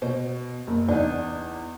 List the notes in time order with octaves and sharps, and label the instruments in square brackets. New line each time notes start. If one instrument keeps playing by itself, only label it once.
[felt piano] B2 [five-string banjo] C5
[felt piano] F#1
[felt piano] E2 [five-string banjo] D4 D#4